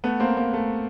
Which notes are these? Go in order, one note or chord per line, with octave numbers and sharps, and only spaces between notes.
A3 B3
A#3 C4
A#3
A3